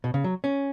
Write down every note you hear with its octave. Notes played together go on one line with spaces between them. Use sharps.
B2
C#3
F#3
C#4